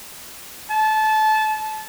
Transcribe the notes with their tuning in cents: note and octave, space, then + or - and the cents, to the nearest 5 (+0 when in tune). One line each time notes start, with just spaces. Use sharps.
A5 -25